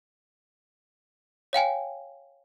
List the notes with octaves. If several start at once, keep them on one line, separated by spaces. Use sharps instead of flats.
C#5 F5 G5 G#5